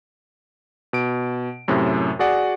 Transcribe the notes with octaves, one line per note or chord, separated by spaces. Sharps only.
B2 D7
F#2 A2 C3
F#4 G#4 D5 F#5